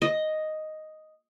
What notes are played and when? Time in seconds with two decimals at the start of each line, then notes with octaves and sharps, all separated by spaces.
0.02 D#5